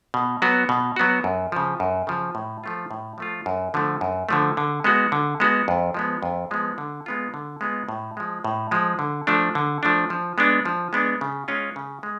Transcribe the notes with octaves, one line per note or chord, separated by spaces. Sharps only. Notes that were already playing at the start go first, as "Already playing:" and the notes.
B2
F#3 B3 F#4
B2
F#3 B3 F#4
F#2
C#3 F3
F#2
C#3 F3
A2
F3 A3 F4
A2
F3 A3 F4
F#2
D3 F3 A3
F#2
D3 F3 A3
D3
G#3 B3 F#4
D3
G#3 B3 F#4
F2
F3 G#3 B3
F2
F3 G#3 B3
D3
G#3 B3 F4
D3
G#3 B3 F4
A2
F3 G#3
A2
F3 G#3
D3
F3 A3 D4
D3
F3 A3 D4
F3
G#3 B3 D4
F3
G#3 B3 D4
C#3
G#3 C#4 F4
C#3
G#3